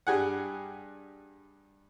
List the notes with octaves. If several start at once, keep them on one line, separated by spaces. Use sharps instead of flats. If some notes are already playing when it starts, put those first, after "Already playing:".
G2 G3 G#4 F#5